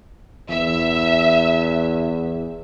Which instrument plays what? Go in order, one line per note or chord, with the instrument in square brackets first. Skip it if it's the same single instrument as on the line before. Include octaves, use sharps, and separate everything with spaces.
[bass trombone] E2 [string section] E5